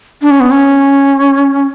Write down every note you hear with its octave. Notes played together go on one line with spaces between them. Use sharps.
D4
C#4
B3
C#4